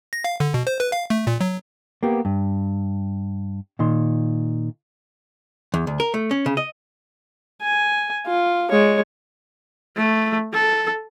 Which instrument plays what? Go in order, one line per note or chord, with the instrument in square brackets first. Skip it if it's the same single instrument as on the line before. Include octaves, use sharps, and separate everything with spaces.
[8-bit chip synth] A#6
F5
D3
B2
C5
B4
F5
A3
A#2
F#3
[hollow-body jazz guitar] A#3 B3 G4
G2
A#2 D#3 C6
E2
D2
A#4
A3
C#4
C#3
D#5
[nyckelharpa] G#5
F4
G#3 C#5
[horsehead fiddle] A3
A4